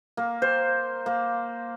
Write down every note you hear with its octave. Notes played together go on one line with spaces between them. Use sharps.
A#3
C5
A#3